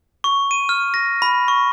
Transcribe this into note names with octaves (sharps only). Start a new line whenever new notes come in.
C#6
D#7
F6
A#6
B5
C#6